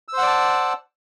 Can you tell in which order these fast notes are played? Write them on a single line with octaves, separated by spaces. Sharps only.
E6 C5 F#5 D5 A5